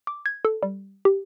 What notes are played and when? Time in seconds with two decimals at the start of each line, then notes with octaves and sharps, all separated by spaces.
0.07 D6
0.26 G#6
0.45 A4
0.63 G3
1.05 G4